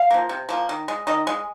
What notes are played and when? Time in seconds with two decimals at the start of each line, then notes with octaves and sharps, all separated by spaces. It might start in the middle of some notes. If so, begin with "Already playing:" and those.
Already playing: F5
0.11 F3 A#3
0.29 C3
0.49 F3 A#3
0.69 D#3
0.88 G#3
1.07 D#3 D#5
1.27 G#3